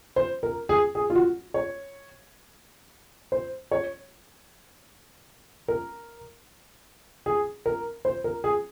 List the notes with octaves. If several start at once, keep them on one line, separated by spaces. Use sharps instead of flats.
C5
A#4
G#4
G#4
F4
F#4
C#5
C5
C#5
A#4
G#4
A#4
C5
A#4
G#4